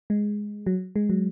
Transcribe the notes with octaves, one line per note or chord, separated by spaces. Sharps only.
G#3
F#3
G#3
F#3